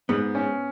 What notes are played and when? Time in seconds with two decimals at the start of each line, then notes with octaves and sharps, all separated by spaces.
0.09 G#2 B3
0.35 C#4